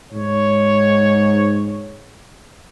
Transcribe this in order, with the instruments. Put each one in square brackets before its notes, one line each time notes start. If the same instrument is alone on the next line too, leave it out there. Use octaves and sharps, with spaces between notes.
[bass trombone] G#2 [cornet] C#5